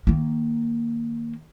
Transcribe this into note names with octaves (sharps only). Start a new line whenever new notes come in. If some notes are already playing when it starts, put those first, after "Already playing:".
D#3 A#3